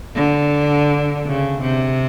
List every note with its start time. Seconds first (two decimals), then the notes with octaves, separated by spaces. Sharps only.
0.15 D3
1.25 C#3
1.61 C3